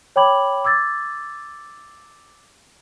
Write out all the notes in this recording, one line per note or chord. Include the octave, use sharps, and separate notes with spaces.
C#5 G5 B5 D6 G#6 F#7
D6 E6 G#6 A6